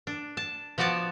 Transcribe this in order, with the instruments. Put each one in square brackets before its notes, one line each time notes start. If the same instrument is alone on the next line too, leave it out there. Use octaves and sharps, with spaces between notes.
[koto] D4
A5
F3 B3 F#4 D5 A5